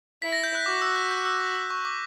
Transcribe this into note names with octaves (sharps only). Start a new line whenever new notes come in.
E4 B6
A#6
G6
F#6
F#4 D6
E6
F#6
G6
E6
D6
E6
C#6
D6